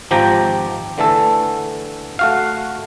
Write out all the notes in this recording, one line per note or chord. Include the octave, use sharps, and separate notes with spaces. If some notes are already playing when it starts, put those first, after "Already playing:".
G#1 F3 G4 G5 A#5
D3 E3 A3 A4
A3 F#4 F5